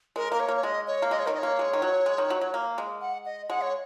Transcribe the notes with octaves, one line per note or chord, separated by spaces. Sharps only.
G#3 A#4
A#3 A#4
C#5
A#3
C#5
G#3 D#5
C#5
A#3
G#3 D#5
C#5
D#3 A#4
D#5
A#3 C#5
G#3
D#3
F#3
G#3
D#3
F#3
F#3
A#3
G#3
F#5
D#5
G#3 F#5
C#5